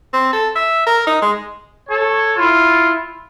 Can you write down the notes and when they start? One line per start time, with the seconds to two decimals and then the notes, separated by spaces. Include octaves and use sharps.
0.14 C4
0.33 A4
0.56 E5
0.87 A#4
1.07 D#4
1.22 G#3
1.89 A4 C#5
2.37 E4 F4